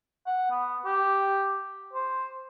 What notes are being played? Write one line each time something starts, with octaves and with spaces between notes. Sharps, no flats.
F#5
B3
G4
C5